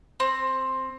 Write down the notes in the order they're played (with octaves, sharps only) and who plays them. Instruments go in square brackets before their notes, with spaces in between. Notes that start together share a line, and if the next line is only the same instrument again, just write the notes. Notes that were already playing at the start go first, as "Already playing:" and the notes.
[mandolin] C4